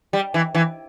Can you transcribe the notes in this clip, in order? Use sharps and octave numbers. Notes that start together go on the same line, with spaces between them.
G3
E3
E3